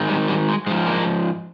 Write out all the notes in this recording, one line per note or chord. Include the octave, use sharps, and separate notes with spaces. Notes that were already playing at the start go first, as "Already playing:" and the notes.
Already playing: G#2 D#3
G3
G3
G#3
G#2 F3 G#3
A#3